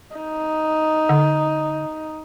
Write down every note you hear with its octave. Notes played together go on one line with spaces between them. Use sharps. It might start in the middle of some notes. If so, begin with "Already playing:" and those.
D#4
D3